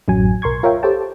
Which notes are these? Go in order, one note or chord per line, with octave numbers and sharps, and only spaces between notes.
A1 F#2 F#3 G#5
B1 A#4 C6 C#6 G#6
F4 A#4 C#5 E5 F5 G5
G4 A4 C5 C#5 G5 A5